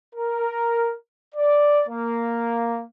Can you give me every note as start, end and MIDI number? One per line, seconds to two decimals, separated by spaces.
0.15 0.93 70
1.35 1.82 74
1.88 2.84 58